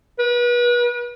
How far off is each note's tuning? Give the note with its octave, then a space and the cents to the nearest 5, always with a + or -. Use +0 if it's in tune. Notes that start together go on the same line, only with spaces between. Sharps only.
B4 -35